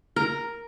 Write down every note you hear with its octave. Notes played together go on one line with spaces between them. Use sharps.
A#4